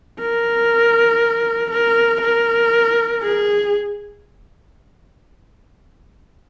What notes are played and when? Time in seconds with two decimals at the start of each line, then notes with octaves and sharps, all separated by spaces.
0.20 A#4
1.71 A#4
2.21 A#4
3.22 G#4